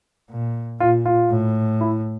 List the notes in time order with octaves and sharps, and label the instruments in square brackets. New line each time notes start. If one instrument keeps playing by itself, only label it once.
[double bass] A#2
[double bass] A#2 [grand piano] F4
[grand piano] F4
[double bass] A2
[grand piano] E4